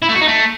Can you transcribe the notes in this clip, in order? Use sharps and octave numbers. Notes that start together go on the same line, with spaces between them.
E4
A3
F#4
D#4
A3